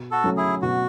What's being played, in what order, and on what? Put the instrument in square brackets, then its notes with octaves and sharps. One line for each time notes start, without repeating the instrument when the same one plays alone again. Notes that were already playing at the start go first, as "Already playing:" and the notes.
Already playing: [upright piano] B2
[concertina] F#4 A4
[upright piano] F#3 A3 C#4
[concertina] E4 G#4
[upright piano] B2 [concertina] F#4